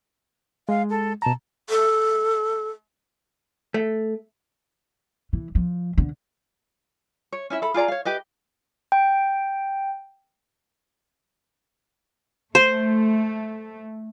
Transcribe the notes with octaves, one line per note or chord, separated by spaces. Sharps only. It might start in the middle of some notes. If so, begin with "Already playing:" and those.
G#3 F5
A4
B2 A5 A#5
A4
A3
E3
F3
D3
C#5
C#4 E4 E5
A4 B5
F4 G#4 D5 A#5
C#5 F5
G4 B4 D#5
G5
A3 C5